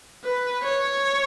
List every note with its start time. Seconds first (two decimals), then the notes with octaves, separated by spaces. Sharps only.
0.24 B4
0.63 C#5